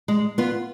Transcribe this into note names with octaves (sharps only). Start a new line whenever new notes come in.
G#3
B3 F4